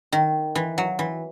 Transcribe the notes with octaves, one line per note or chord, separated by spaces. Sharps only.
D#3
E3
F#3
E3